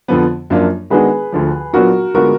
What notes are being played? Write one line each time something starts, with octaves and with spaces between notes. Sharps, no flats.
F2 D3 F3 B3
F#2 F3 A#3 D4 F4
D#3 G#3 B3 D4 F#4 G#4 B4
D2 D3 F3
A#2 F#3 B3 D4 F4 F#4 A#4
D3 G#3 B3 F4 F#4 A#4